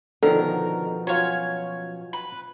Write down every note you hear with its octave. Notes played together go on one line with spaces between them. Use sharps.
B2 D3 D#3 F3 A4 A#4
F#3 C#4 F4 C#5
B4